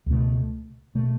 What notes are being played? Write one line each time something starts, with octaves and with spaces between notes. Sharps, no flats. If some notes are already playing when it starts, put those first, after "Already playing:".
C#2 B2 A3
B2 A3